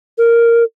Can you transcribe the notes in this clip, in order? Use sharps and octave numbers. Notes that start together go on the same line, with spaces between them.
A#4